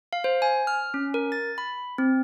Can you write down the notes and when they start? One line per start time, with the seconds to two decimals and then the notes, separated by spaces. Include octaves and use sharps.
0.13 F5
0.24 C5
0.42 G#5
0.67 F6
0.94 C#4
1.14 A#4
1.32 A6
1.58 B5
1.98 C4